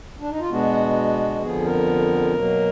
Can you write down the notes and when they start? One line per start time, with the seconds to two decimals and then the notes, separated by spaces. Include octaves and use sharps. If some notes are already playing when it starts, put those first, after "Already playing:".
0.20 D4
0.30 D#4
0.40 F4
0.50 B2 G#3 B3 D4 F#4
1.42 F2 D3 F3 B3 G#4
1.65 A#4
2.34 B2 F#3 A#3